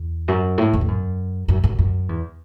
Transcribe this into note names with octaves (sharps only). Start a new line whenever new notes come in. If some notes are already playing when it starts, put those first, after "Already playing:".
Already playing: E2
F#2
A2
E2
A2
F#2
F#2
F#2
F#2
E2